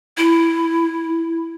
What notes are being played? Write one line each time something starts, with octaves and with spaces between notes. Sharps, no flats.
E4